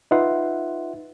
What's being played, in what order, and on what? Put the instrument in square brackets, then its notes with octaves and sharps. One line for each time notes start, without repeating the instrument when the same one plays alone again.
[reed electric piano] D#4 F4 B4 E5 F#5 C6